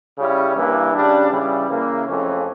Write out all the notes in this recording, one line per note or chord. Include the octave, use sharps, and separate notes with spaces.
C#3 G3 C#4 E4
G2 E3 A#3
C#3 G3 D4
C#3 E3 G3
C#3 E3 A#3 E4
F2 C#3 E3 A3 C#4